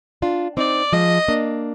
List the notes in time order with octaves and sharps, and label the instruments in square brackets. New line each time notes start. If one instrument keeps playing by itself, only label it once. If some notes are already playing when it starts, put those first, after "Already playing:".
[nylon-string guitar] D4 F4
[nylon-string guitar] C4 D#4 [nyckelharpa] D5
[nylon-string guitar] F3 G#3 [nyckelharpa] D#5
[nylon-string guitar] A#3 D4